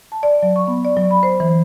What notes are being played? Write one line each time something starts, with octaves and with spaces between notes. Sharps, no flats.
A5
D5
F#3
C#6
B3
D5
F#3
B5
C5
E3